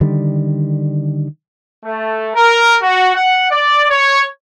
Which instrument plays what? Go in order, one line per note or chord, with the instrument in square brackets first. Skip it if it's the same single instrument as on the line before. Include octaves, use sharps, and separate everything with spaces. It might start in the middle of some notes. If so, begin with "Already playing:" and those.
[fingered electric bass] D3 D#3 G3
[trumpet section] A3
A#4
F#4
F#5
D5
C#5